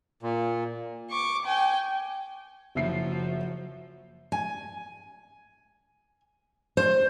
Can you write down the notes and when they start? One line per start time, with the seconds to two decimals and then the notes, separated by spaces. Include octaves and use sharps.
0.23 A#2
1.11 C#6 D6
1.45 G5 G#5
2.75 F#1 F3 F#3 E5 C7
4.32 G#5
6.77 C5